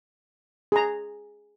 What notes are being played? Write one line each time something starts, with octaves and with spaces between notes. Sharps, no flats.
G#4 A#5